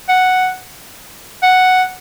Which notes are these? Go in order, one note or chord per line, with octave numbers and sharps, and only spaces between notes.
F#5
F#5